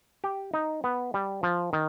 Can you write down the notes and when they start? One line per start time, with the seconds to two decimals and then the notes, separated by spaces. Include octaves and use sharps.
0.24 G4
0.54 D#4
0.84 B3
1.14 G3
1.43 F3
1.73 D#3